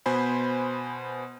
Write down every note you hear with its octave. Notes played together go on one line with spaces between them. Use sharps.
B2 B3 C5 G#5 B5